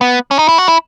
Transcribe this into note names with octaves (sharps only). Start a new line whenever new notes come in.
B3
C#4
D#4
E4
F#4
E4